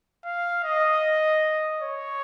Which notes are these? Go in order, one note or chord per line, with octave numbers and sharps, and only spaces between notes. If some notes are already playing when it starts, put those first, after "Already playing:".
F5
D#5
C#5